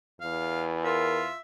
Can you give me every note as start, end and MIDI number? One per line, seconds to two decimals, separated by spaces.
0.21 1.28 40
0.21 0.66 77
0.85 1.36 65
0.85 1.21 70
0.85 1.40 76